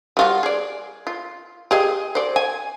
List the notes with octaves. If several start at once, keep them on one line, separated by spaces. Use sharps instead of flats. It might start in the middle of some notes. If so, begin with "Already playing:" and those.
G3 F4 F#4
G#4 D5
F4
G4 G#4 D#5
C5 D5
G#5